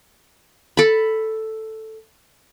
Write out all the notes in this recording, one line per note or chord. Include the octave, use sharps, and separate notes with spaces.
A4 B5